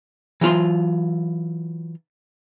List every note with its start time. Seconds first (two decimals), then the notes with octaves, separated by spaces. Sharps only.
0.41 E3 F#3 F4 C6